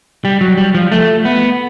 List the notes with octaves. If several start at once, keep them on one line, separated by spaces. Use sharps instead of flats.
G3
F#3
G3
F3
A3
B3